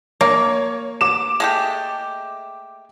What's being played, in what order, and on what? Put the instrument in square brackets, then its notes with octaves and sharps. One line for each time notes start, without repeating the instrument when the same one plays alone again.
[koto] A#3 [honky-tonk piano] C#5
[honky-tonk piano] D6 E7
[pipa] G#3 A3 G4